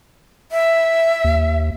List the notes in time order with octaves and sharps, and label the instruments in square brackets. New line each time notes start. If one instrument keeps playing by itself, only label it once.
[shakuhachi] E5
[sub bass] D#2